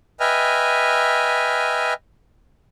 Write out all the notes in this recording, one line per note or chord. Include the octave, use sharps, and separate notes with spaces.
B4 D#5 E5 G5 G#5 F6